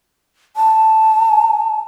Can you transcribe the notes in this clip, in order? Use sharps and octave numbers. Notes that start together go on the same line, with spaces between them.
A5